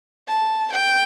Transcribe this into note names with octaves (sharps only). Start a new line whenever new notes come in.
A5
G5